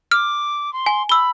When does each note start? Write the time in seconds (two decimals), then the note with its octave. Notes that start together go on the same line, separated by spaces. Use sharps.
0.12 D6 F6
0.73 C6
0.86 G#5
1.09 B5 E6 G7